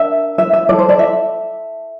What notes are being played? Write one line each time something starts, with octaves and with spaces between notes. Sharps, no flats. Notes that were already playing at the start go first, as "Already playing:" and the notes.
Already playing: D4 A#4 E5
E5
E5
E4 A4 D5
C5
D5
E5